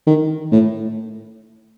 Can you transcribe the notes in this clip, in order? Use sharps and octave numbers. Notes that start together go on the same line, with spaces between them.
D#3
A2